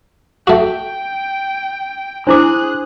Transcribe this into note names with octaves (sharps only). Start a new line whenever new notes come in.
A3 F#4 G5
D4 E4 G#4 C5 D6 F#6